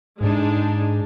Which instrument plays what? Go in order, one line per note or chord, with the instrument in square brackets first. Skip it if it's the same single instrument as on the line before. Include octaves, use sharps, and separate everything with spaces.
[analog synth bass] G#2 [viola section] G#3 D4 D#4